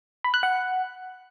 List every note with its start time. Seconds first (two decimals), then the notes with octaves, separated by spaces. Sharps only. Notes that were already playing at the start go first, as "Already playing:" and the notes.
0.24 B5
0.34 F#6
0.43 F#5